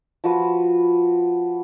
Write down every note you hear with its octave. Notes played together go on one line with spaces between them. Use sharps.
F3 F#4 B4